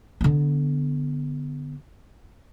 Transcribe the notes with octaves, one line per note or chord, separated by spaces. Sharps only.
D3 B3